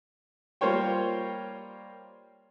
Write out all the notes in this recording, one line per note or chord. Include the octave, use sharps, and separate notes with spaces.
G3 A#3 F4 C5 C#5 G5